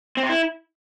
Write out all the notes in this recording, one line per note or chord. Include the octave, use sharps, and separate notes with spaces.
C4
C3
E4